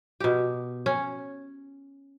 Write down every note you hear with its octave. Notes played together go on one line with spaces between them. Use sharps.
B2 G4
C#4